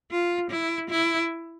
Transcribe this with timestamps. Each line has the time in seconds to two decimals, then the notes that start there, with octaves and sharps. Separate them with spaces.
0.12 F4
0.51 E4
0.91 E4